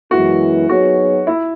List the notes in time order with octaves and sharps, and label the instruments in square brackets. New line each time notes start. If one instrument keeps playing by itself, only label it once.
[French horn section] F#2 E3 G#3 B3 E4 [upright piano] F#4
[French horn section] F#3 B3 D#4 G#4 C#5 [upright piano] F#4
[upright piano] E4